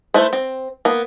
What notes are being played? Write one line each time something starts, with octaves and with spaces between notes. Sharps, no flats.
A3 E4 B4 C5
C4
A#3 B3